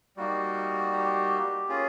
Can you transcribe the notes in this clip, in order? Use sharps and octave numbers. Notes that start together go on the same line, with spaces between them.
G3 A#3 D#4 F#4
G4
A#3 C#4 F4 G#4